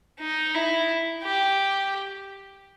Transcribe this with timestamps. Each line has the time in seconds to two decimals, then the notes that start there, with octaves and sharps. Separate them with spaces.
0.20 D#4
0.54 E4
1.23 G4